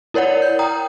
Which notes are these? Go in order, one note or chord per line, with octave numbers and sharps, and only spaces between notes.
E4 A#4 C#5 D5 F#5
G6
G5 A#5 D#6